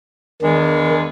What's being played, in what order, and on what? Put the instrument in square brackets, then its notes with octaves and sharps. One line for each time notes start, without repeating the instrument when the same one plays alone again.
[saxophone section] E2 G#3 D4 [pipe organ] D#3